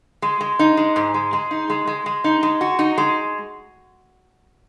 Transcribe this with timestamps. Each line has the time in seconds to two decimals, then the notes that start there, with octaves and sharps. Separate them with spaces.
0.22 G#3
0.41 G#3
0.59 D#4
0.77 G#3
0.96 G#2
1.14 G#3
1.33 G#3
1.51 D#4
1.70 G#3
1.87 G#3
2.06 G#3
2.24 D#4
2.43 G#3
2.61 F#4
2.79 D#4
2.98 G#3